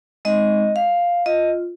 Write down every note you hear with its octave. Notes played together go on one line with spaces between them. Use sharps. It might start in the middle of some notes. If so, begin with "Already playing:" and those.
G#3 C4 D#4 D#5
F5
F4 D#5